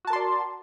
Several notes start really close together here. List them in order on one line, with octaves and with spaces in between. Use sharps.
F#4 A5 A#4 C6 D5